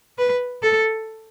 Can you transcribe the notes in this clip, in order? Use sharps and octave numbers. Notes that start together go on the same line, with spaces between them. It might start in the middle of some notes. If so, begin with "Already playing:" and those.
B4
A4